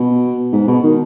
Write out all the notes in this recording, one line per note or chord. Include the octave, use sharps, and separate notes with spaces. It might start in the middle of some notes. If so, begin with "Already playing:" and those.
Already playing: B2
G#2
B2
D#3